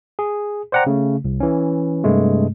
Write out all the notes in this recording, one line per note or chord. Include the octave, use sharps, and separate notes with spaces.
G#4
C5 D5 F#5 G5 A#5
C#3 A3
C2
E3 C#4
G2 C3 G#3 A3